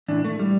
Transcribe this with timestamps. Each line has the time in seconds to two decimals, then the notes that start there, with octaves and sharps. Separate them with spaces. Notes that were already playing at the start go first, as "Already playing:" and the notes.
0.08 A2 E3 D4
0.25 A3
0.39 A2 E3 G3